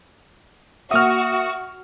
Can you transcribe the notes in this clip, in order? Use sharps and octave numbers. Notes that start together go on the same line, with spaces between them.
A#3 F#4 E5 D#6 F6